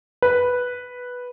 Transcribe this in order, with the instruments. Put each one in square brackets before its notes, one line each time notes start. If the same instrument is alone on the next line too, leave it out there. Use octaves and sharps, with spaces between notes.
[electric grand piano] B4